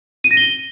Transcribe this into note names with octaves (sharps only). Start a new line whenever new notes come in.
D#7
A#6
G7